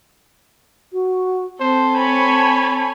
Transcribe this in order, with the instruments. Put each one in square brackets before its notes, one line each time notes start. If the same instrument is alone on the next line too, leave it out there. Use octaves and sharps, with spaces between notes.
[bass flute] F#4
[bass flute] C4 [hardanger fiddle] A4 [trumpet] C5
[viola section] C#5 G#5 B5 [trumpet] A5